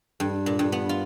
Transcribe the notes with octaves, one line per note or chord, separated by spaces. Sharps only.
G2
A#2
G2
B3
F4